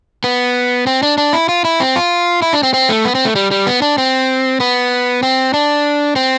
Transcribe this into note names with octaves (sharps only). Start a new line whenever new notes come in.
B3
C4
D4
D4
E4
F4
E4
C4
F4
E4
D4
C4
C4
A3
B3
C4
A3
G3
G3
B3
D4
C4
B3
C4
D4
C4